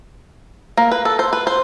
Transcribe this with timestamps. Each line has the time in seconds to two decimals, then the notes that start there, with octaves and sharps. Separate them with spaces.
0.77 A#3
0.91 B4
1.05 A4
1.19 C5
1.33 B4
1.47 C5